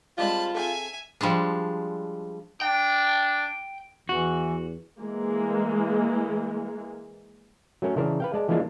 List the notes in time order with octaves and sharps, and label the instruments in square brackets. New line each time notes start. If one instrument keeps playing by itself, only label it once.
[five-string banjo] G3 G#3 C4 [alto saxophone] F4 [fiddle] A5 B5
[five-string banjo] C4 G#4 A4 [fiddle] E5 G#5
[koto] F3 G3 G#3 D4
[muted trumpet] D4 [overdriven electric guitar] G5
[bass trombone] E2 [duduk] E3 [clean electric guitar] F#4
[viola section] E3 G#3 A#3
[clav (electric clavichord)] F#3 A3 C#4 A#4 C#5
C#3 E3 D4 A#4 C5
B4 F5 G5
G#3 D5 A5
E3 F3 G#3 A#3 D4 F4